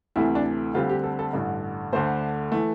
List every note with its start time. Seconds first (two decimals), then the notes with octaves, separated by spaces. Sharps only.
0.16 D2 C3 E3 A3 E4
0.35 D4
0.74 D2 D3 G3 C4 F4
0.89 G4
1.04 A4
1.19 A4
1.33 A1 G2 D3
1.93 D2 D3 A3 C5
2.52 E3 A3